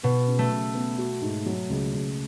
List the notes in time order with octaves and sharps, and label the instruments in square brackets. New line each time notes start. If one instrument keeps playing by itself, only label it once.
[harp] B2 [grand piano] B3
[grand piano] C#3
[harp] A3
[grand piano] C#3
B3
F#4
G#2
F#3
C#2
C#2